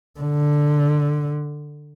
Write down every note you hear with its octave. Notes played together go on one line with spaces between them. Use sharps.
D3